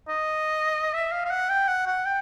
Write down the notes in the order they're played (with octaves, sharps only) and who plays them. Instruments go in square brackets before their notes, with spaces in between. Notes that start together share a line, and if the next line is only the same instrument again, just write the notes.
[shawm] D#5
E5
F5
F5
F#5
G5
F#5
F#5
G5